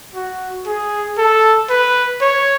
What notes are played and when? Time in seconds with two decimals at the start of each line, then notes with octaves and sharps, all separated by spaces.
0.14 F#4
0.66 G#4
1.18 A4
1.69 B4
2.21 C#5